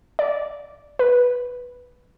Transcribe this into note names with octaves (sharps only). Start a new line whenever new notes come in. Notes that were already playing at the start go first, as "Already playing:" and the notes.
D5
B4